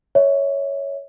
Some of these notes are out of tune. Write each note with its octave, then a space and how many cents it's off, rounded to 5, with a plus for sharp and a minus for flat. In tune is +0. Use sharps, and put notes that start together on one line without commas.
C#5 +5 E5 -25